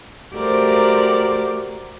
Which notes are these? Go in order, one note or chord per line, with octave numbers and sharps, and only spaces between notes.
A3 F#4 G4 A#4 C5 D5